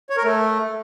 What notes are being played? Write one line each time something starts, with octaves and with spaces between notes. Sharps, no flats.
C#5
A#4
A3